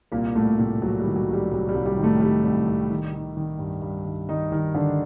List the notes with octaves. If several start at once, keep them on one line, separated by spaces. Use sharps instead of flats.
C2 A#2 A#3
C2 A2 A3
A2 C3 A3
C2 F#3
G3
D#3
F#3
C2 G3
C2 F#3
G3
C2
G3
D#3
A2 A3
D#3 G3
C2
C2
D#3
D#3
D#3
G2
G2
D#3
D#3 D#4
G2 D#3 D#4
D3 D#3 D4